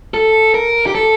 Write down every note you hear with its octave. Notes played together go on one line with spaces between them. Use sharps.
A4
A#4
G4
A4